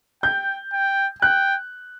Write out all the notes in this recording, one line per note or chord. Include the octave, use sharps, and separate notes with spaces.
G5 G6
G5
G5 F#6